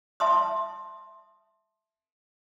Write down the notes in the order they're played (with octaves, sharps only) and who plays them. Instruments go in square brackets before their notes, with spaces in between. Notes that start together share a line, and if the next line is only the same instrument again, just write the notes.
[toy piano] E5 A5 C6 D#6